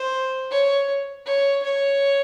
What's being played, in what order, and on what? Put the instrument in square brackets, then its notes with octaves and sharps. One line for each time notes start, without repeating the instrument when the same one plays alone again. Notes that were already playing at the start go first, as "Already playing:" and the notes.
Already playing: [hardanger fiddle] C5
C#5
C#5
C#5